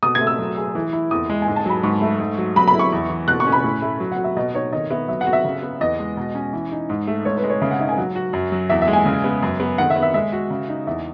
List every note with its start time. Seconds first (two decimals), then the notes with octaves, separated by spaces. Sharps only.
0.03 B2 D#6
0.15 G#6
0.20 A3
0.27 E6
0.39 F#3
0.57 G#4
0.75 E3
0.93 E4
1.11 E2 D#6
1.29 G#3
1.42 G#5
1.48 G#2
1.56 A5
1.66 F#3 B5
1.83 G#2 C#6
2.02 A3
2.20 G#2
2.38 F#3
2.56 F#3 B5
2.68 B5
2.74 E4
2.79 C#6
2.92 E2
3.10 E3
3.28 B2 F#6
3.40 C#6
3.47 C#4
3.52 B5
3.64 A2
3.82 A3
4.00 F#3
4.12 F#5
4.18 F#4
4.24 E5
4.37 B2 D#5
4.54 D#4 C#5
4.72 D#3 D#5
4.91 B3 E5
5.08 F#3 E5
5.21 F#5
5.27 F#4
5.33 E5
5.44 C#3
5.62 B3
5.80 E2 D#5
5.99 G#3
6.17 B2
6.35 C#4
6.53 E3
6.72 D#4
6.90 G#2
7.07 A3
7.25 G#2 C#5
7.37 B4
7.44 G#3
7.50 C#5
7.61 C#3 E5
7.71 F#5
7.80 D#4 E5
7.89 G#5
7.98 F#3 F#5
8.16 F#4
8.33 F#2
8.52 F#3
8.69 E2 E5
8.82 E5
8.88 G#3
8.93 G#5
9.06 C#3
9.24 B3
9.43 F#2
9.60 B3
9.78 D#3 F#5
9.90 E5
9.96 B3
10.02 E5
10.14 G#3 E5
10.33 F#4
10.50 C#3
10.68 D#4
10.87 E2 E5